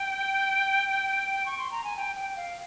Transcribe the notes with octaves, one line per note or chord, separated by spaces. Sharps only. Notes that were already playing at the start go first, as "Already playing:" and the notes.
Already playing: G5
C#6
C6
A#5
G#5
G5
G5
F5